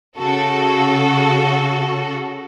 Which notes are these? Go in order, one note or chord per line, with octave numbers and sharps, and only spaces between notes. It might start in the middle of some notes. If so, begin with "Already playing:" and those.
C#3 F#4 A4